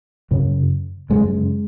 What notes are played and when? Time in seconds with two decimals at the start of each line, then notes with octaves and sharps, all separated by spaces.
0.31 F#2 C#3
1.10 F#2 C#3 G#3